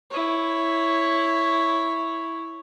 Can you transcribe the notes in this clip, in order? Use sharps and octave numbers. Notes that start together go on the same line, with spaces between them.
E4 C#5